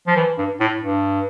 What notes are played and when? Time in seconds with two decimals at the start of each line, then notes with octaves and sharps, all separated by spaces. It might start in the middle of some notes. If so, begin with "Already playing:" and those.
0.07 F3
0.16 E3
0.38 G2
0.60 A2
0.81 G2